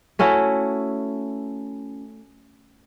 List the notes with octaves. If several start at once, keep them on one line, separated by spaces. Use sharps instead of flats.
A3 C#4 E4 F#4